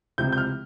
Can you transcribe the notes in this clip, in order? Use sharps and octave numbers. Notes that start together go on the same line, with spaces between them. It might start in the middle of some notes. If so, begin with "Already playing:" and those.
C#2 C3 F3 C4 G6
G6
F6